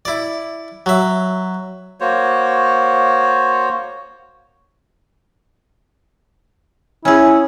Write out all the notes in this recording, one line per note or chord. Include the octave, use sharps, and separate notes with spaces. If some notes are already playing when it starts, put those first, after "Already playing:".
E4 D5
F#3 E5
A#3 F#4 C5 C#5
C#4 E4 G#4